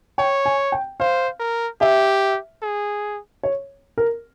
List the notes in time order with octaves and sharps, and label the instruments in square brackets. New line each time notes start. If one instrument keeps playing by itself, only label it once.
[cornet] C#5 [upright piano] G5
[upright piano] G#5
G5
[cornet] C5 [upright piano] F5
[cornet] A#4
[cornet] G4 [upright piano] E5
[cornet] G#4
[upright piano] C#5
A#4